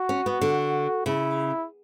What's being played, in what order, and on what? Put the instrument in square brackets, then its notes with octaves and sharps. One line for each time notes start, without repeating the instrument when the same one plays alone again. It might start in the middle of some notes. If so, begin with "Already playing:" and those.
Already playing: [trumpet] F#4
[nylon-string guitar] C#4
B3
D3
[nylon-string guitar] C#3 [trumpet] E4